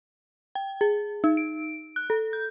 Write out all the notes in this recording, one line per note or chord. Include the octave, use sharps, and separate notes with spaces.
G5
G#4
D#4
D7
F#6
A4
G6